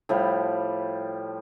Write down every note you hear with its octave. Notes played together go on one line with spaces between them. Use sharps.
A2 F3 G3